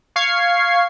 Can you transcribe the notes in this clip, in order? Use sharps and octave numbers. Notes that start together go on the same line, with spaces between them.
F5 C#6 G#6 C7